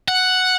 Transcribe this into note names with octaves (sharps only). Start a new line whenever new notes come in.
F#5